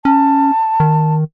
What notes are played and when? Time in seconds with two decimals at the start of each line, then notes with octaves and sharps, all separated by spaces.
0.05 C#4 A5
0.80 D#3